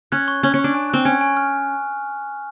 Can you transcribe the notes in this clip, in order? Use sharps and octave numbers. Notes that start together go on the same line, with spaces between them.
C#4 F#6
C#6
C#4 C#6
C#4
C#6
D4
G#5
C4 F#6
C#4 G#5
G#5
F6